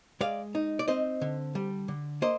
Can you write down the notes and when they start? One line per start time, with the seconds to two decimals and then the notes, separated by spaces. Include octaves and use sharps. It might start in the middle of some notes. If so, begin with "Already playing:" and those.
0.21 G#3 D5 F5
0.55 D#4
0.79 D5
0.88 C4 C5 D#5
1.21 D3
1.55 G3
1.88 D3
2.22 A#3 C5 D#5